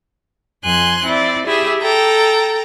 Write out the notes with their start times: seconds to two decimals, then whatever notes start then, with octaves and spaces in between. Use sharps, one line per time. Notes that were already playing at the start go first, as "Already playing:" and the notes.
0.64 F2 G#5 C6 F#6
1.04 C4 E4 D5
1.46 E4 G4 G#4 E5
1.82 A4 G5 A#5